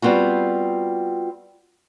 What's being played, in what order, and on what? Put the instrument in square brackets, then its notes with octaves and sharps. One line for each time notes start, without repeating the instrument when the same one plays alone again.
[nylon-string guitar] G3 B3 C4 F4 F#4